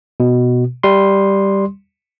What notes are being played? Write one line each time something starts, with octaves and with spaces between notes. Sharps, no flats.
B2
G3 C6